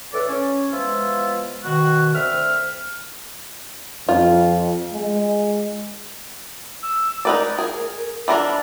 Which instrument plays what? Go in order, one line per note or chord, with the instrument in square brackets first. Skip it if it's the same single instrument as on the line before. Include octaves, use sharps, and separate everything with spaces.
[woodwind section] A2 E3 A4 B4 D5
C#4
E3 F3 G#3 B3 E4 F4
B2 D#3 F#4
D2 C4 E5 F6
[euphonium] F2 [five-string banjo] F4
[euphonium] G#3
[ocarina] E6
[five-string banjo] D#4 B4 D5 [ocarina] A#4
[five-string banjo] G#4
[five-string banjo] E3 D4 A#4 [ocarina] B5